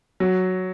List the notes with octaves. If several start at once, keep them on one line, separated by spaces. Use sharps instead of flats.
F#3